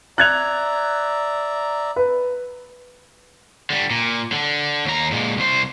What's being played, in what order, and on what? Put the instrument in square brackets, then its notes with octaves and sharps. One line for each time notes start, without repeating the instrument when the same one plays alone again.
[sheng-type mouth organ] D5 E5 A#5 [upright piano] F#6 G#6 F7
[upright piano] B4
[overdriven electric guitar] D3 G3
A#2
D3
D#2 A#5
A#2 G#3
C2 C5